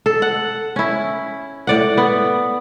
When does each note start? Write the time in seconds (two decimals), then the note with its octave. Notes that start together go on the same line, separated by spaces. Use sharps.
0.06 A4
0.22 F#5
0.76 C#4 E4
1.67 A2 D5 F#5
1.97 B3